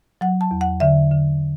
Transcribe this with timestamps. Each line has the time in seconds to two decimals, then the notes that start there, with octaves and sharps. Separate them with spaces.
0.21 F#3 F#5
0.41 A5
0.51 E2
0.61 F#5
0.80 D3 E5
1.11 D3